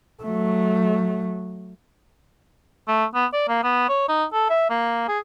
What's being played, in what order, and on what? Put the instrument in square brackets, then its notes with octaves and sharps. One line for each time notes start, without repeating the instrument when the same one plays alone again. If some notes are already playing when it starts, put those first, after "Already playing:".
[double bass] F#3 A3
[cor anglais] A3
B3
D5
A#3
B3
C#5
D#4
A4
E5
A#3
G#4